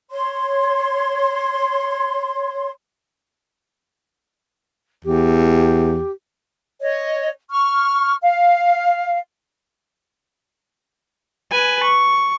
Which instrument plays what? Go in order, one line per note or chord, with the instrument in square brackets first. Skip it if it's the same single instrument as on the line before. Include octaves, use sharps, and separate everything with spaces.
[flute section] C#5 C6
[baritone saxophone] E2 [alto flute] G4
[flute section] C#5 D#5
C#6 F6
F5
[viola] B4 G#5
C#6